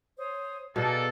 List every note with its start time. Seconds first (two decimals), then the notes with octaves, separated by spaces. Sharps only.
0.18 C5 C#5 D#6
0.76 B2 A#3 G#4 A4 D5